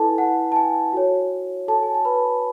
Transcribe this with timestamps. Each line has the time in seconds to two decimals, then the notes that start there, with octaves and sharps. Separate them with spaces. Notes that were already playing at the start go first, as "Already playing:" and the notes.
Already playing: E4 A4 B4 G#5 A5
0.18 F#5
0.52 A5
0.56 G#5
0.93 F#4 A4 C#5
1.68 A4 A5
1.83 G#5
1.94 A5
2.05 B4 B5